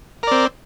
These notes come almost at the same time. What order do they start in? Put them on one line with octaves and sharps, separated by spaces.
A#4 D5 C4